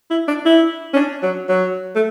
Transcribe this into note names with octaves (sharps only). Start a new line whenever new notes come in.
E4
D4
E4
C#4
D4
F#3
F#3
A3